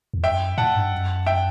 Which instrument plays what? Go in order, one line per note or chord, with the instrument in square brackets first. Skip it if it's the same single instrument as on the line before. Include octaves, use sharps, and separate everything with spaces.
[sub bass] E2
[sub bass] F#2 [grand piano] E5 G5
[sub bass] A2 [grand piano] F#5 A5
[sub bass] G2
F#2
[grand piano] E5 G5